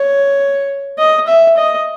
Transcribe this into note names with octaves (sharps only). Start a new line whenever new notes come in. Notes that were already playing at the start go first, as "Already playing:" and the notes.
Already playing: C#5
D#5
E5
D#5